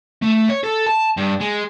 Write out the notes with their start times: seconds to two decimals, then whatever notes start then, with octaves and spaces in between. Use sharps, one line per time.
0.22 A3
0.50 C#5
0.64 A4
0.87 A5
1.17 G2
1.41 G#3